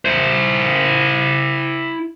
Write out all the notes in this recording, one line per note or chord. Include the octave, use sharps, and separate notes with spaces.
E4 C5